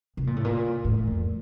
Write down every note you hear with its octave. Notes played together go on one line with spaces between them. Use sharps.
C3
A#2
A2
A#2
A2
F2